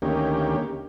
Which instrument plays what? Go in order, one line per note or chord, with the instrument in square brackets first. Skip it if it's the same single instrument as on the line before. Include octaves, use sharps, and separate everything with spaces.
[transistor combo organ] D2 D#3 A#3 C#4 G4